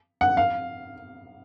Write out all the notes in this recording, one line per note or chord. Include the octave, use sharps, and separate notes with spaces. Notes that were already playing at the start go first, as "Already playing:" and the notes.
F#5
F5